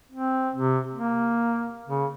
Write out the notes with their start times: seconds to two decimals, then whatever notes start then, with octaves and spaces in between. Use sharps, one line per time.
0.12 C4
0.56 C3
0.94 A#3
1.88 C#3